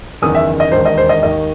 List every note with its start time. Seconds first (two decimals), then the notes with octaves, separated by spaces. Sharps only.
0.22 F#1 E2 D#3 D#6
0.35 E5
0.60 D#5
0.72 E1 D#2 D#3 C5
0.85 D#5
0.98 C5
1.09 D#5
1.23 D#2 D#3 D#5